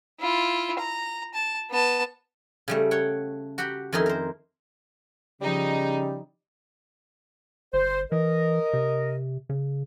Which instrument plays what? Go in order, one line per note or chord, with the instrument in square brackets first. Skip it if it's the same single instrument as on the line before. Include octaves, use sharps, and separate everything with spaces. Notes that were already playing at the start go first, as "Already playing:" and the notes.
[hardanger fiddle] E4 F4
A#5
A5
B3 A5
[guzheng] C#3 G3 A3
C#5 F#5 G5
F#4 G4 F#5 G5 B5
F2 D#3 C#4 D#4 E4 C6
A#4 C5
[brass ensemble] C#3 [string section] F3 D#4 [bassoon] G3
[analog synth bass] G1 [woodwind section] C5
[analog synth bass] E3 [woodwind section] A#4 D#5
[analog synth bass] C3
C#3